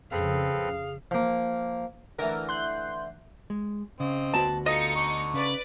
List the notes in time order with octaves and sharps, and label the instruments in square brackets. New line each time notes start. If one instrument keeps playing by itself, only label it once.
[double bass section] F2 C#3 [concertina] C4 A4 B4 [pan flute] G#4 [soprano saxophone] F5
[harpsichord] F3 A#3
[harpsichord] D3 E3 A3 [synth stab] A#4
[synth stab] C6 F#6 G6
[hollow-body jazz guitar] G#3
[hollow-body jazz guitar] C#3 [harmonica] C4 D#5
[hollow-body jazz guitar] D2 B3 F#4 [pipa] A5
[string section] D#4 C#7 [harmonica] F4 A4 [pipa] D#5
[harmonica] D3 C#6
[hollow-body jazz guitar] C#3 [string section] B4 D5